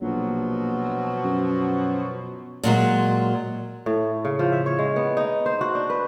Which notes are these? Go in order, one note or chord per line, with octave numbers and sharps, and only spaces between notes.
A#1 B2 F3 F#3
F#2
A#2 F#3 G#3
A2
C#3
F3
E5
C#5
G#3
B3
D#4
C5
F#4
D4
B4